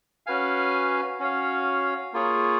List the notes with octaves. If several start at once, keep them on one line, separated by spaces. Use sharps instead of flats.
C#4 F#4 B4 F5 G#5
C#4 F#4 C#5 F5
A#3 F4 G#4 C#5